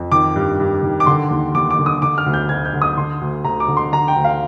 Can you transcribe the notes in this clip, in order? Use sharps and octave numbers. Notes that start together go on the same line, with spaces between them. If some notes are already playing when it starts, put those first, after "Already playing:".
Already playing: F2
D#3 D6
G2
G2
D#3
D6
D3 C6
D#2
D#2 D6
D6
D3
D#6
D3 D6
F6
D2
G6
D2 G#6
G6
D3
D#6
D3 C6
D2
D2 A#5
D6
D3
C6
D3 A#5
G5
D2
F5